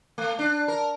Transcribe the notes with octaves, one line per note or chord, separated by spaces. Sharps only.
A3
D4
A#4